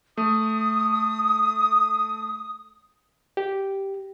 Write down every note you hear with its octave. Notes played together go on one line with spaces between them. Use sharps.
A3 D#6
G4